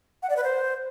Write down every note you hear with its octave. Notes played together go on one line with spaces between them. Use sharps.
F#5
D5
B4
C5